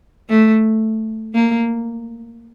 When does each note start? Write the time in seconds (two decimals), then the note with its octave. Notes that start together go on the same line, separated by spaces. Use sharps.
0.30 A3
1.35 A#3